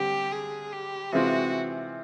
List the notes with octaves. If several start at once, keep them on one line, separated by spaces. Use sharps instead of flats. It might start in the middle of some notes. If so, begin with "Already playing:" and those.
Already playing: D3 G3 C4 G4
G#4
G4
C3 E3 G#3 C4 F4 F#4